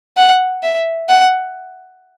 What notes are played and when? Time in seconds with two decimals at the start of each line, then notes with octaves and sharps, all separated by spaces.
0.17 F#5
0.63 E5
1.09 F#5